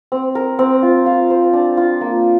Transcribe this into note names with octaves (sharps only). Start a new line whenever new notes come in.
C4
A#4
C4
F4
F5
C5
D4
F4
A#3